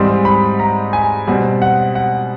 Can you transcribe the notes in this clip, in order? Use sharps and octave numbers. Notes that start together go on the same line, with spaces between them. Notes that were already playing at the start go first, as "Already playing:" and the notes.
Already playing: G#2 E3 G3 C4 C6
B5
A#5
G#5
B2 G3 C4 F#5
F#5
F#5